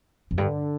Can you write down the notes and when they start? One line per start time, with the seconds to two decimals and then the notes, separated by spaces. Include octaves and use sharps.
0.31 F2
0.38 G2 D3